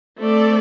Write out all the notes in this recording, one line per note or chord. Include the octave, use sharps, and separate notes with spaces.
A3 C4 A4 D5